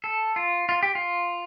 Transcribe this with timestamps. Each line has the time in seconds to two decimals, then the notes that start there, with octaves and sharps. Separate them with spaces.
0.04 A4
0.36 F4
0.69 F4
0.83 G4
0.95 F4